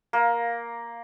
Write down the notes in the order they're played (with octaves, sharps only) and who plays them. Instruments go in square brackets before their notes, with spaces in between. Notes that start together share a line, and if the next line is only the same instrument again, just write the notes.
[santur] A#3